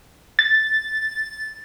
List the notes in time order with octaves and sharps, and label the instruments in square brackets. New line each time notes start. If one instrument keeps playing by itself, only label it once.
[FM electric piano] A6